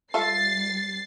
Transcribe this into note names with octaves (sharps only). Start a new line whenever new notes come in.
G3 F4 A4 E5 A6 C7